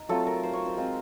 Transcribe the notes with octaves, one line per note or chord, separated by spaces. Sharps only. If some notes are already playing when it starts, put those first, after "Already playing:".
Already playing: D#4
F#3 A3 C4 F4 A4
A#4
C5
C#5
C5
G#3 C4 F4